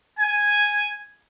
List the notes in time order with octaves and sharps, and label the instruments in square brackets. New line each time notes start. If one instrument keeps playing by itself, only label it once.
[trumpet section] G#5